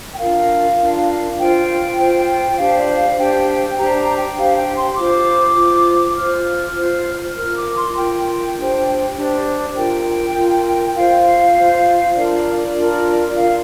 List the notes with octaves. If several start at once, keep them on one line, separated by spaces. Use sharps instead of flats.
G5
D4 F4 A#4 F5
D4 F4 A#4
F4 C5 G5
F4 C5
D4 G4 C5 F5
D5
F5
D4 G4 C5 G5
D4 G4 C5 A#5
A#5
G5
D4 G4 C5 F5
G5
C6
F4 C5 D6
F4 C5
D6
F4 C5 F6
F4 C5
F4 A#4 F6
D6
C6
F4 A#4 G5
D4 G4 C5
D4 G4 C5
F4 A#4 G5
F4 A#4
F4 C5 F5
F4 C5
D4 F4 A#4 D5
D4 F4 A#4
F4 A#4 F5